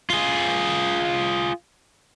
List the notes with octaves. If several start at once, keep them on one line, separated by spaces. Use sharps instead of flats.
F4 G#4